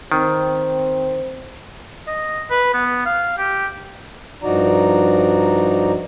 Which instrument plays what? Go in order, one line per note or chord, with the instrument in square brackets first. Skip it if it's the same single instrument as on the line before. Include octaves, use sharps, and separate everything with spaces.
[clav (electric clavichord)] D#3 [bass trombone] C4
[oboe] D#5
B4
B3
F5
G4
[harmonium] G2 F3 D#4 F#4 D5 A#5